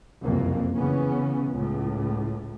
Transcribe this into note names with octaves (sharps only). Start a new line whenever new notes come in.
F#1 C2 F2 A#3
C#3 E3 B3 C#4
C#2 A2